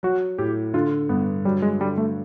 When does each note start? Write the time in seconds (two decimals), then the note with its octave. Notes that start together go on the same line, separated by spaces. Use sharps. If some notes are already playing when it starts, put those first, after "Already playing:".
0.03 F#3 F#4
0.38 A2 G4
0.74 D3 F4
1.09 G2 B3
1.45 F#3 G3
1.62 G#3
1.80 D3 G3
1.98 A3